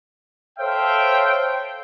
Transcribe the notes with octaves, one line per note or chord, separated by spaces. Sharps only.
A4 C5 C#5 E5 F5 G5